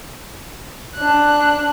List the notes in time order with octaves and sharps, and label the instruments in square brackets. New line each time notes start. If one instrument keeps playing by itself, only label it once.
[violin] D4 F#6